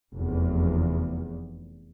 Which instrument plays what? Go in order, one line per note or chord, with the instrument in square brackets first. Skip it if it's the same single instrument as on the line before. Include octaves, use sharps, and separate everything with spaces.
[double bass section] F1 E2